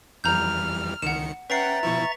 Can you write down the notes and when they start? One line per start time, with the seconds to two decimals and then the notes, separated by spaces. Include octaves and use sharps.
0.24 F2 E3 G3 A#5 F6 G6
1.02 C#2 D#3 F#5 C#7 E7
1.50 C#4 B4 E5 F#5 G5 A#5 A6 C7
1.83 B2 F3 E4 C#6